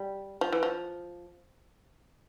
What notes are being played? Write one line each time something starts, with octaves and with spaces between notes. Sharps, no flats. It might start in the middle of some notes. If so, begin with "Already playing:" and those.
Already playing: G3
F3
E3
F3